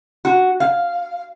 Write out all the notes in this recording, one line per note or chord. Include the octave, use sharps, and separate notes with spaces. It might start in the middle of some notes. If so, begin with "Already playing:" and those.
F#4
F5